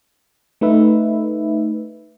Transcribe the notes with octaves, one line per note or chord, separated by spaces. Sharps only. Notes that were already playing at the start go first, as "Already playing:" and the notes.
A3 D#4 B4 E5